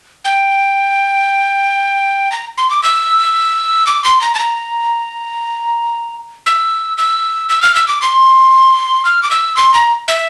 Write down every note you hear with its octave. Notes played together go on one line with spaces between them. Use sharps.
G5
A#5
C6
D6
E6
D6
C6
A#5
A5
A#5
E6
E6
E6
F6
E6
D6
C6
F6
D6
E6
C6
A#5
E5